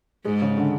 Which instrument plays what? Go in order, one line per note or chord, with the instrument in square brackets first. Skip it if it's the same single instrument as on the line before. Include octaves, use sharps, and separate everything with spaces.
[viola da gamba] G#2 [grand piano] G#3
[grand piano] C#3
D3